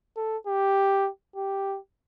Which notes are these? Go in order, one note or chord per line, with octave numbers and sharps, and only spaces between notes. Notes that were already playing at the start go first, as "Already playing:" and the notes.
A4
G4
G4